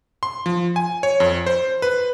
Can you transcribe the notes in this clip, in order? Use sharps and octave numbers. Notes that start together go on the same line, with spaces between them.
C6
F3
G#5
C#5
F2
C5
B4